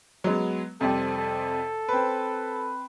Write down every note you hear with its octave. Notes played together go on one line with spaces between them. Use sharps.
F#3 G#3 B3
F2 C3 G3 A4
A4
C4 B4